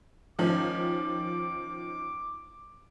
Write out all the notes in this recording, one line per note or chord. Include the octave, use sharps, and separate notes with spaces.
D#3 F3 C#4 D6